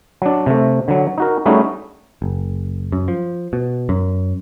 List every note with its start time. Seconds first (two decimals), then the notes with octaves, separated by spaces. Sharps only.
0.22 F#3 D4
0.46 C3 A3
0.88 D3 F#3
1.18 D#4 F#4 A#4
1.46 G3 A3 C#4 D#4 F#4 G#4
2.22 F#1
2.92 F#2
3.08 F3
3.53 B2
3.89 F#2